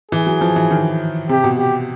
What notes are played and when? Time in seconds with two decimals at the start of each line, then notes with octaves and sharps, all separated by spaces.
0.12 E3 G#4
0.27 F#3
0.41 F3
0.56 E3
0.71 D#3
1.29 C3 G4
1.44 B2
1.58 G4